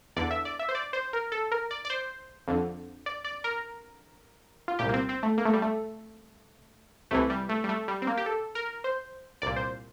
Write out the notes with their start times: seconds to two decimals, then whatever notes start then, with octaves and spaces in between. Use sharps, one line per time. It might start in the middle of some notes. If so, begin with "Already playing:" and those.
0.16 E2 D3 D5
0.31 E5
0.45 D5
0.59 E5
0.69 C5
0.75 D5
0.93 C5
1.13 A#4
1.32 A4
1.52 A#4
1.71 D5
1.85 D5
1.90 C5
2.48 F2 D3
3.06 D5
3.24 D5
3.44 A#4
4.68 F4
4.79 C2 A#2 G4
4.89 A#3
4.94 C4
5.09 C4
5.23 A3
5.38 A#3
5.45 A3
5.53 G3
5.62 A3
7.11 C2 C3 E3 A3
7.30 G3
7.49 A3
7.64 G3
7.69 A3
7.88 G3
8.02 C4
8.07 A#3
8.17 G4
8.26 A4
8.55 A#4
8.84 C5
9.42 C2 A#2 D5
9.56 C5